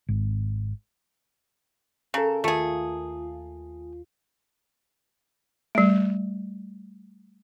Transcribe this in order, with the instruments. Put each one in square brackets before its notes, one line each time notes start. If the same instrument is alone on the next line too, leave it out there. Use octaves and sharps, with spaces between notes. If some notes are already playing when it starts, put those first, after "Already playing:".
[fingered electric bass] G#1
[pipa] C#3 [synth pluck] A4 A#4
[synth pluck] D#2 F4 [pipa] A3 G#4
[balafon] G3 A3